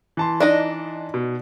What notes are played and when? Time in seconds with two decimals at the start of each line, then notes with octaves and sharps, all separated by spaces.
0.17 E3 A5 C6
0.40 D4 D#4 D#5
1.14 B2